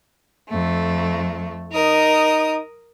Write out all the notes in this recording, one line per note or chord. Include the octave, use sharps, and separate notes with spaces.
F2 A3
D#4 A#4 D#6